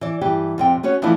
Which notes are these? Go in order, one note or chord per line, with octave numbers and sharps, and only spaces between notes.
E3 D5
G2 E3 G4
F2 C3 G5
B3 C#4 F#4 C#5
E3 F3 A3 B3 D4 E4